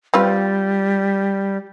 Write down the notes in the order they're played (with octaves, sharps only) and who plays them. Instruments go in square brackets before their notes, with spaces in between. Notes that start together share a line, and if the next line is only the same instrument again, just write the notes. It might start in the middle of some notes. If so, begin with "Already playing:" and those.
[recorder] G3 [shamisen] C4 F4 B4